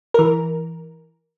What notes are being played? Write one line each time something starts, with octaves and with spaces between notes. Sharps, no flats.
E3 A#4